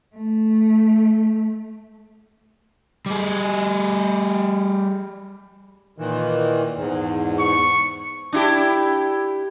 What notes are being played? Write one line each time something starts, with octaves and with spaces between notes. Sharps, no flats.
A3
G3 G#4
A#2 D#3 E3
E2 G#2
C#6
D4 E4 G4